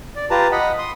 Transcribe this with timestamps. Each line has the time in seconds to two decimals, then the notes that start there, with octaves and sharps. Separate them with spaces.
0.16 D5
0.30 F4 G4 B4 A5 A#5
0.52 D#5 F#5 B5
0.78 C6 D#6